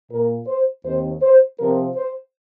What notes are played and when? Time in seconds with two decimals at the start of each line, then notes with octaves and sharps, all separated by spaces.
0.10 A#2 A#3 A#4
0.47 C5
0.84 D#2 D#3 C4 C5
1.22 C5
1.59 C3 F3 C4 A#4
1.96 C5